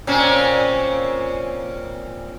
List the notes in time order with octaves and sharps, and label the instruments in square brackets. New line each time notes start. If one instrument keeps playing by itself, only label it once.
[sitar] A#2 C4 C#4